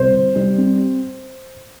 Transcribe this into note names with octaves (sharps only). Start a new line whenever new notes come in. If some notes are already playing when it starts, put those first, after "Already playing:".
Already playing: C2 C5
C3
G3
C4